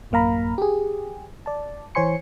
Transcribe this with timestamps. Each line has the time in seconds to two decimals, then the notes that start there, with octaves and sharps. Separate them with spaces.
0.11 A1 F#2 A#3 F5 A#5 B5
0.58 G4 G#4
1.46 D5 A5
1.95 E3 C5 C#5 G#5 C6 C#7